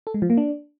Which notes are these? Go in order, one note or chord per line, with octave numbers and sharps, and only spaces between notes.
A4
G#3
F3
A#3
D4